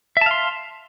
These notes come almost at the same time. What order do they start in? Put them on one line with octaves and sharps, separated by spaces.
E5 A5 F5 C6